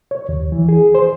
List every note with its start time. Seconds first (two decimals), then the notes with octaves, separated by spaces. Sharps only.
0.11 C#5
0.29 D#2
0.52 E3
0.69 G#4
0.95 C5